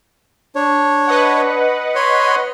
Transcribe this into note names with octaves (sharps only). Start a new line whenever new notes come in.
D4 C#5
B4 D#5 F#5
C#5 B5 C6